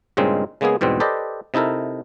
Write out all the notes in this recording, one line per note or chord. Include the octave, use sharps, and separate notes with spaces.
G2 A#2 C#3 G#3 C4 D#4
C#3 G#3 A#3 B3 G#4
E2 G#2 B2 G3 C4
G4 A4 B4 C5 D5 D#5
C3 D#4 E4 A4 A#4